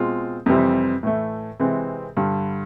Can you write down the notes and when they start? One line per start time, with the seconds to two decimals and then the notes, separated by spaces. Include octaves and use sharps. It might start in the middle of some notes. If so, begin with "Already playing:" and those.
Already playing: B2 G#3 C4 F4
0.46 F2 C3 E3 G3 C4
1.03 A2 E3 A3
1.59 C3 E3 G#3 C4
2.17 G2 D3 G3